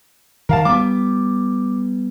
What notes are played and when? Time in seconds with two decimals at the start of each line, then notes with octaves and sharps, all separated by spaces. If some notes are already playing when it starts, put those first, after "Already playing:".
0.49 D#3 A#4 F5 A5
0.65 G3 B3 D6